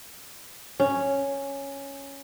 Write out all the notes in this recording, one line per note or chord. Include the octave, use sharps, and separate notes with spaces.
C#4